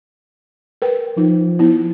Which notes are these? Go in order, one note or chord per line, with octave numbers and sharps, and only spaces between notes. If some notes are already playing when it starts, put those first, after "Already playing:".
A#4 B4 G5
F3 D#4
B3 E4